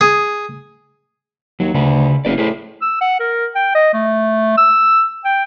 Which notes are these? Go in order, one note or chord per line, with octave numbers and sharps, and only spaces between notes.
G#4
D#2 F#3
D2 C#3 B4
F#1 E4 B4 D5
A2 G#4 B4 C5
E6
F#5
A#4
G5
D#5
A3
E6
G5